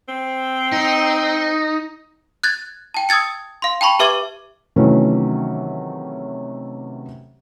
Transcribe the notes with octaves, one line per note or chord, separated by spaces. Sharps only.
C4
D#4
F#6 G#6 A6
G5 A5
D#6 E6 G#6 A6 C#7
F5 C6
G5 A5 B5 C#6
G4 B4 E5 D6 G#6 G7
C3 D#3 E3 F#3 A3 C#4